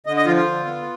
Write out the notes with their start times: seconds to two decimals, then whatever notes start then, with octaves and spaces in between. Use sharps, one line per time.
0.06 D3 D#5
0.17 D#5
0.26 F3 F4
0.36 F4
0.46 D3
0.65 B3